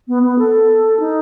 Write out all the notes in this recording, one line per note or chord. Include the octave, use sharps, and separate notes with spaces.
B3
B3
A4
D#4